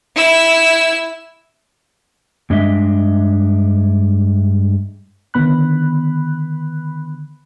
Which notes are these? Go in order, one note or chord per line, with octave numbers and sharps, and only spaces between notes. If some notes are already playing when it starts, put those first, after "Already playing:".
E4 E6
G2 G#3 D4 D#5 E5
D3 D#3 B3 B5 F#6